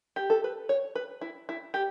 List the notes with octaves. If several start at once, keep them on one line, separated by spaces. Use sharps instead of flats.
G4
A4
B4
C#5
B4
E4
E4
G4